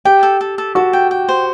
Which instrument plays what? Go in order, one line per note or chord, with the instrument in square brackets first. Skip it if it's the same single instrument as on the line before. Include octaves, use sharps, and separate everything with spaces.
[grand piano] G4 [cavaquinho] G5
[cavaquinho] A4
A4
A4
[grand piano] F#4 [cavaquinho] A4
[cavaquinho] G5
G5
C5